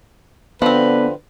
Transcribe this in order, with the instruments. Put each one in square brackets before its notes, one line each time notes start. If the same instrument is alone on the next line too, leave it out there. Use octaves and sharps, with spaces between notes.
[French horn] D3 [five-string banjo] F3 C4 [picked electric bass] B3 [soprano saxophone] B4